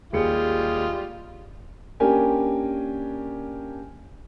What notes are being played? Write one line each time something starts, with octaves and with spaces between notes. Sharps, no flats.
D#2 G3 G#3 F4 G#4 C#7
A#3 C#4 D4 G4 A#4 G#5